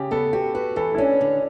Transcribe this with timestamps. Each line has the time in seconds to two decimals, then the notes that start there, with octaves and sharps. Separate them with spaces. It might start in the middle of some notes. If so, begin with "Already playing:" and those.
Already playing: C#3 G4
0.11 B3 A4
0.33 F#4 G4
0.54 F#4 B4
0.76 E3 A4
0.95 E4
0.98 C#4 D4
1.21 D3